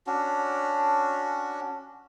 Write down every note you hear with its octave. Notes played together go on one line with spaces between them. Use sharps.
C#4 D4 F#4